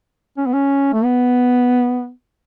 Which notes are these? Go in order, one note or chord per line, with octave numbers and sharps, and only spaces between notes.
C#4
B3
C#4
A3
B3